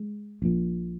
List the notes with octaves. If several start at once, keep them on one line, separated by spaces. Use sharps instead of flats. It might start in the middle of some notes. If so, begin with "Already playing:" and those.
Already playing: G#3
A#1 A#2